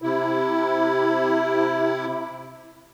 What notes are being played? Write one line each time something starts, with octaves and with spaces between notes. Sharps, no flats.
C3 E4